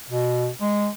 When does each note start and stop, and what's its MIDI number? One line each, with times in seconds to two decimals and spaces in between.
0.10 0.48 47
0.61 0.88 56